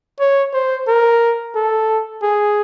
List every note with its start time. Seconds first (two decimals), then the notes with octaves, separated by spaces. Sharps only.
0.20 C#5
0.54 C5
0.88 A#4
1.55 A4
2.23 G#4